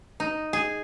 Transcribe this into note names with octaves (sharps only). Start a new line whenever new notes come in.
D#4
G#4